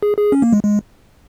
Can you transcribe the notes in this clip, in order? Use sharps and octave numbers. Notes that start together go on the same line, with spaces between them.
G#4
G#4
C#4
A#3
G#3
G#3